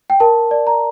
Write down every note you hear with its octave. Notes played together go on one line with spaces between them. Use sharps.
G5
A#4 A5
D5
A#5